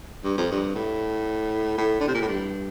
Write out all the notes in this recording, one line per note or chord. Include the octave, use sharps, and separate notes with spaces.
G2
F2
G2
A2
A2
D3
C3
A#2
A2
G2